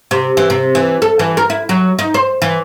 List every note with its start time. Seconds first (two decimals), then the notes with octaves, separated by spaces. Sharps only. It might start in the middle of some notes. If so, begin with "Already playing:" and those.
0.11 C3
0.37 E3
0.50 C3
0.75 E3
1.02 A4
1.19 E3
1.37 A#4
1.50 E4
1.69 F#3
1.99 D#4
2.14 C5
2.42 E3